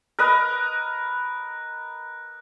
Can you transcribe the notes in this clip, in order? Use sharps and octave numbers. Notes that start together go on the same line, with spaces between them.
A#4 B4 D#5 F#6